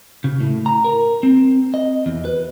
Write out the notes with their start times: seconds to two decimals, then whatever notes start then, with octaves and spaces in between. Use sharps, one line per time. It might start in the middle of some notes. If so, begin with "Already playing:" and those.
0.24 C#3
0.41 A2
0.66 A#5
0.84 A#4
1.23 C4
1.74 D#5
2.06 E2
2.25 B4